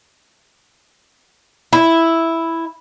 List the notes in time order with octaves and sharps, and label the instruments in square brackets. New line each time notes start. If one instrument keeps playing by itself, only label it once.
[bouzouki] E4